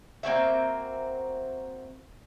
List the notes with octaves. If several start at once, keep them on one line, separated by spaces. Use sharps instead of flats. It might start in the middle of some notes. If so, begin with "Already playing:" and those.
A#3 C4 F#4 E5